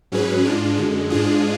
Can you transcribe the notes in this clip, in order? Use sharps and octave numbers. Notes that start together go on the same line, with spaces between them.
G#2 F#3 C#4 G#4 B4
G#2 G#3 D4 F4
F#2 D3 G#3
G#2 G#3 D4 F4 G#4